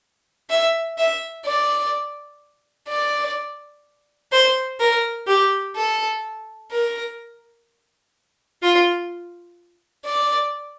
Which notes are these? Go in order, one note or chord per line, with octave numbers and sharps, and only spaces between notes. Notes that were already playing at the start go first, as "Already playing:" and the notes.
E5
E5
D5
D5
C5
A#4
G4
A4
A#4
F4
D5